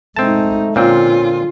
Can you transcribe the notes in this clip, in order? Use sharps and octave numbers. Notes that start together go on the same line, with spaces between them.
G#3 A3 C4 D#4 A5
A#2 D3 C4 C#4 F4